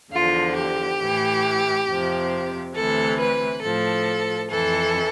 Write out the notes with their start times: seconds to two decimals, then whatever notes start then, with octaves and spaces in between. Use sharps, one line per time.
0.12 E2 D3 F3 F4
0.56 G4
1.00 A2 E3
1.88 F2 C3 F3
2.75 D2 C3 E3 A4
3.20 B4
3.63 A2 F3 A4
4.50 F2 E3 A4